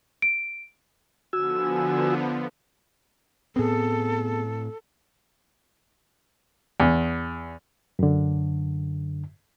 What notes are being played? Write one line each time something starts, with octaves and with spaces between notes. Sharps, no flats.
D7
D3 F3 B3 F#4 G#5 E6
A2 B3 C4 G#4 A4
E2
F#2 D3